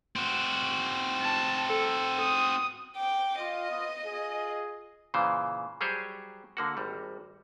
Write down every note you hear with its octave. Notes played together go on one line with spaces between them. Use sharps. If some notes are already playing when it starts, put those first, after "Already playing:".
C4 F#4
A5
A4
D#6
G5 D6
F4 D#5
B3 F4 D#6
F4 G#4
A#2 C#3 E3 C5
F#3 G3 G4 G#4 C5 C#5
D3 A#3 F#4
G#1 G3